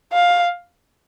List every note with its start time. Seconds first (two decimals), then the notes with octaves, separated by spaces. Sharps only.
0.13 F5